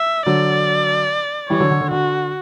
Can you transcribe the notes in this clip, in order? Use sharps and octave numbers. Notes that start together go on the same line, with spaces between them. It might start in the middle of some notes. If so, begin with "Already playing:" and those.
Already playing: E5
D3 F#3 D5
E3 G3 C#5
D3 F#3
D3
D3
D3 F#4